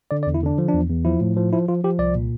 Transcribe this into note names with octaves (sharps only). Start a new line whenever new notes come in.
D3 D5
D5
E2
E4
D3 D4
F3
D4
E2
E2
F3 E4
A2
F3
F3 E4
F3 F4
F3 G4
C2 D5
A#2